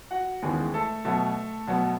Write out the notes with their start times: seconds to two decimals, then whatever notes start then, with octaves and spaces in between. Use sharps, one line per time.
0.11 F#4 F#5
0.42 D#2 C#3 E3 G#3 B3 G#4
0.74 A3 A4
1.05 B2 F#3 A3 B3 A4
1.67 B2 F#3 B3